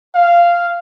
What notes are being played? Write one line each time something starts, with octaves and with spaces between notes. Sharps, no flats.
F5